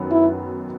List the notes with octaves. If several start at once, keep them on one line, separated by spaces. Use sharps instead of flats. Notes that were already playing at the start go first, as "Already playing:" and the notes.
Already playing: F#2 D#3 F#3 B3
E4